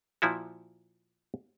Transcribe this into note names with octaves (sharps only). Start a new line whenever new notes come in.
A#2 F3 E4 F#4